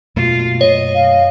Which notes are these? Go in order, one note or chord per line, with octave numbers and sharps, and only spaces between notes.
F#2 B2 A3 A#3 F4
C#5 D#5
F5